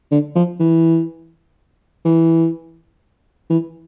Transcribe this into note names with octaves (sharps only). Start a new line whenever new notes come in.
D3
F3
E3
E3
E3